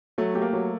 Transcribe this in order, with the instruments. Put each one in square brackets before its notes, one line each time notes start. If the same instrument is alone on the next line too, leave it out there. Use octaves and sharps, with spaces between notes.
[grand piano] F#3 [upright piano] A3
[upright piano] A3 [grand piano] G4
[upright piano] A#3
[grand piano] F#3